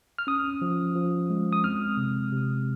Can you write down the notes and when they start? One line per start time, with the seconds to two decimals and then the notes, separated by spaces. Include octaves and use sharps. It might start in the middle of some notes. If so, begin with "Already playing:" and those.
0.18 F6
0.27 C#4 D#6
0.62 F3
0.95 F3
1.30 G#3
1.53 D#6
1.64 C4 F6
1.97 C3
2.32 C3